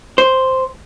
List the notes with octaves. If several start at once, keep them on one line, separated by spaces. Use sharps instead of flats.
C5